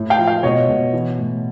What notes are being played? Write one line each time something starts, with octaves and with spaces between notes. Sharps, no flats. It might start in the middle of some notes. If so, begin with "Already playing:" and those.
Already playing: A2
F5 G5
F3
F5 G5
B2 C#5 D#5
B2
E3
A2